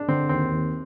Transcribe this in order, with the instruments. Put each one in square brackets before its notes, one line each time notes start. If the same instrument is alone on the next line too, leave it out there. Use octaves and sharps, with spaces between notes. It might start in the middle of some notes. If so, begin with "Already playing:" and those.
Already playing: [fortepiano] D4
[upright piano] D3 [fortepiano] C4
[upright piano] D#2 [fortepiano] C4
[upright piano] D#2